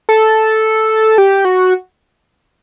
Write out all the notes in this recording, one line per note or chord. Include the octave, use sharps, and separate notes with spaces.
A4
G4
F#4